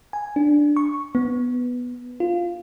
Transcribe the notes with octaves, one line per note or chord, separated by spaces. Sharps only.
G#5
D4
C#6
B3
F4